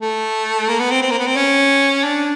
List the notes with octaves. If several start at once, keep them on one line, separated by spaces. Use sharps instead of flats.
A3
A#3
B3
C4
C4
A#3
B3
C4
C#4
D4